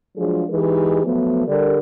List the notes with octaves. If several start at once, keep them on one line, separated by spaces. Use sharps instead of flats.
F3 F#3 G#3 D4 F4 G#4
E3 G#3 D#4 G4 G#4 B4
F3 F#3 A3 B3
D3 G3 A#4